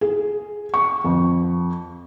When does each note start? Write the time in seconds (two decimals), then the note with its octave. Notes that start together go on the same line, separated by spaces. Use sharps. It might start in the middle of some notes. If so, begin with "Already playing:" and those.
0.01 G#4
0.74 C#6
1.04 F2